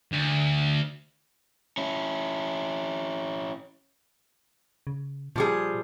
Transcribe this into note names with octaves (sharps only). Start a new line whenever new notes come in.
D2
C#4 E4
C#3
A#2 F3 G3 G#4